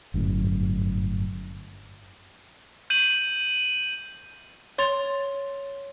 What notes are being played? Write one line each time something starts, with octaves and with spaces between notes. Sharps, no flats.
G1 F#2 A2
G6 D#7 F#7
C#5 C6 A6 F7